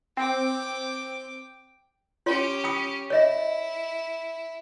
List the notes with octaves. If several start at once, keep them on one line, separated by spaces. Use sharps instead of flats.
C4 G5 D6
C#4 F4 G4 C#5 C6
G5 B5 D#6
E4 C#5 D#5 E5